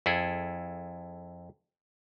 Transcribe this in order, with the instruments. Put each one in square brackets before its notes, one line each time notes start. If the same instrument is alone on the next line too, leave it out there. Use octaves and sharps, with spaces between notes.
[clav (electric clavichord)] F2 E4 G#4 A4